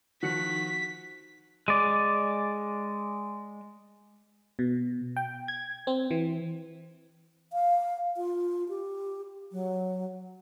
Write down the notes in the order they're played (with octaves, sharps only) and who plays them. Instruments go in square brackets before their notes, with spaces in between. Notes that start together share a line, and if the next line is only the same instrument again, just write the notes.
[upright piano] D#3 F3 C#7 [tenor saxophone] F#4 [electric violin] B6
[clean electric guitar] G#3 D5
[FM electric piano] B2
G5
G#6
C4
E3
[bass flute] F5
F4
G4
F#3